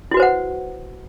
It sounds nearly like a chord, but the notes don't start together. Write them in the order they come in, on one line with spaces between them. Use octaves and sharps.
E4 F#4 B4 C5 F#5